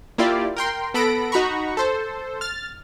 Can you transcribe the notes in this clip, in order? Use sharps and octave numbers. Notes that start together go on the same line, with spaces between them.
A#3 E4 F4 G4 D5
A#4 G5 C6
B3 A4 B5 A#6 D7
D#4 F#4 A#5 B5 C#6
A4 C5
F6 A6